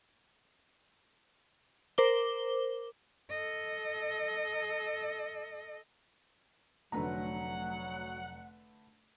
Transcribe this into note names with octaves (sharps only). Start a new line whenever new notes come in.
A#4 C5 D6 G7
A4 D#5
F1 D3 F#3 A3 B4 F#5 A#5